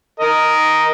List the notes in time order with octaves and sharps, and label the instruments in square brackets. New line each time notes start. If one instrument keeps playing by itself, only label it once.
[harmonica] A#4 D#5